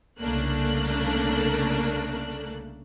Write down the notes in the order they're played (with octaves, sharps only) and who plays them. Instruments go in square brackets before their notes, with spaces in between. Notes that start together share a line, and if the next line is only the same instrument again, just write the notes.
[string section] C2 C#3 A3 A#3 D4 F#6